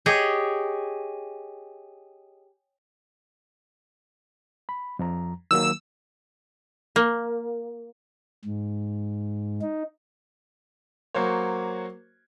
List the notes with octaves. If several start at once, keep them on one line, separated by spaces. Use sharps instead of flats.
G4 G#4 C#5 D#5
B5
F2 F3 A#5
D#3 F#3 A#3 E6
A#3
G#2
D#4
F#3 A#3 F#4 C5 C#5